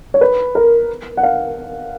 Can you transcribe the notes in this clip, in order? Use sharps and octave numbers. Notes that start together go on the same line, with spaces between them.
C#5
B4
A#4
F#5
F5